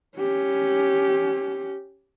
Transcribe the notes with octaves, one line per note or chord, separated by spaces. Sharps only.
C#4 G4